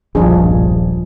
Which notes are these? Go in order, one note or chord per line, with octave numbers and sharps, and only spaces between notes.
D#1 B1 G2 F3 D4 G#4